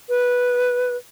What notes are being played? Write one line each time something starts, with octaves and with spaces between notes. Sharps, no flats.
B4